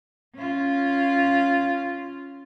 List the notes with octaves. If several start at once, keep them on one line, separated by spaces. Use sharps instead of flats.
C#4 F4